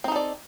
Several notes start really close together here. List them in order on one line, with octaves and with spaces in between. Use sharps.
C4 D#4 A4 D5